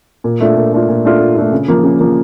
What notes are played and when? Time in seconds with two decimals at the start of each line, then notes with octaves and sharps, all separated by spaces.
0.24 A#2
0.40 A3 D4 F4
0.56 A#2
0.72 A3 D4 F4
0.89 A#2
1.05 A3 D4 F4
1.20 A#2
1.36 A3 D4 F4
1.52 C#3
1.68 F3 A#3
1.83 C#3
1.99 F3 A#3